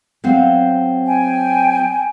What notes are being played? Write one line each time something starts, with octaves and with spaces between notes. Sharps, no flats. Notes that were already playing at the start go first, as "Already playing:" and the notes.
F#3 C4 F5
G5 G#5